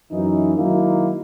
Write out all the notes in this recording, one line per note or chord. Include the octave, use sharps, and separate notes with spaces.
F#2 E3 D#4
D#3 F#3 G#3 A#3 D#4 E4